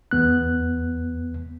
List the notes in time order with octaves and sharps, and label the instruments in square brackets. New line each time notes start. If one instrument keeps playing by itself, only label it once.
[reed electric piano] E2 B3 F#6